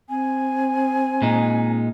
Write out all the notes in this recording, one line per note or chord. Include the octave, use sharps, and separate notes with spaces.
C4 G#5
A#2 G#3 D#4